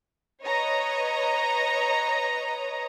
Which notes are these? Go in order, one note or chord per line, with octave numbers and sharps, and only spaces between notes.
B4 C#5 D#5 A#5